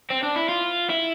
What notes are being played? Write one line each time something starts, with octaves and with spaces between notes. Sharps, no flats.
C4
D4
E4
F4
E4